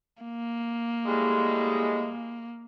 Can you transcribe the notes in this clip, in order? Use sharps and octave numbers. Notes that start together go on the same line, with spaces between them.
A#3
A2 G3 G#3